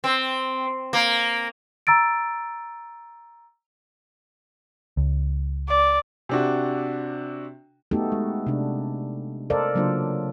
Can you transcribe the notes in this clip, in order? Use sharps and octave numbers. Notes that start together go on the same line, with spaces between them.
C4
A#3
A#5 E6 A6 D7
C#2
D5
C3 D4 F#4
A3 B3 D#4 F#4 G4 A4
G#3
C3 D4
A4 A#4 C5 D5 D#5 F5
C#3 F#3 A#3 D4 F4 C5